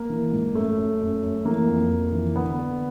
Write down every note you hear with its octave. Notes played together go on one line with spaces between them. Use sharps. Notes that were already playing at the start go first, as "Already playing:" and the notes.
Already playing: A#3
E3
G#2
F#2 A3
F#2
F#2
F#2
E3 A#3
F2
F2
E3
D3 B3
D3